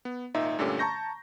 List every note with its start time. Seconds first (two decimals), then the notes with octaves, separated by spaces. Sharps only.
0.05 B3
0.34 G#1 A#2 D#4 E5
0.59 G2 A#2 D3 A3 C#4 G4
0.79 A5 A#5 C#6 G6 A#6